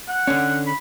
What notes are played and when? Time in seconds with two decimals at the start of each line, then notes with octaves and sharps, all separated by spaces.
0.09 F#5
0.27 D3 C#4
0.66 B5